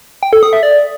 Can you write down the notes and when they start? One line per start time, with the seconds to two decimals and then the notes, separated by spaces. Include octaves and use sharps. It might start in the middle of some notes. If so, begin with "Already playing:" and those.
0.23 G5
0.33 A4
0.43 D#6
0.53 E5
0.63 D5